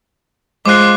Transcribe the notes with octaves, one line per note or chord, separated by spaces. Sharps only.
G#3 F4 C5 D6 F#6